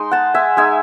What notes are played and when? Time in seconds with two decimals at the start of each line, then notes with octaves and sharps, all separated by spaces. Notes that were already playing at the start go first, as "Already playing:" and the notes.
Already playing: G#3 D#4 C6
0.11 F#5 A5
0.34 E5 G#5
0.57 G#3 D#4 E5 G#5